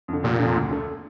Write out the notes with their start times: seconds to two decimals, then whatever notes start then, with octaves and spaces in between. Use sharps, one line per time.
0.08 F2 D3
0.23 F1 A#2
0.39 F2 D3
0.56 D2
0.71 D3 A3